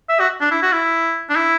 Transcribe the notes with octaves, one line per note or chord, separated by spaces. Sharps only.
E5
F#4
D4
E4
F#4
E4
D4
E4